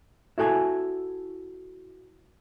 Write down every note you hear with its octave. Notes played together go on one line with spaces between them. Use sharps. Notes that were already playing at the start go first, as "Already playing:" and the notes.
E4 F#4 A4 G#5